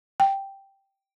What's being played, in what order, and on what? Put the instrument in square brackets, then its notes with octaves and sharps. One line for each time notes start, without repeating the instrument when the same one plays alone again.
[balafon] G5